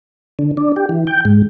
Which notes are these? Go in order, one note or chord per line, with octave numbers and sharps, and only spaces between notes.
D3
D4
G4
E3
G5
G#2